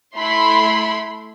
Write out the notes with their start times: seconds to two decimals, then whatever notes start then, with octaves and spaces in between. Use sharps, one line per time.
0.16 A3 E4 B5 C6